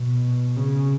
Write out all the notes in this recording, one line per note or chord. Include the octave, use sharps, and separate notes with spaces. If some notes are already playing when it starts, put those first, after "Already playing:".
Already playing: B2
C#3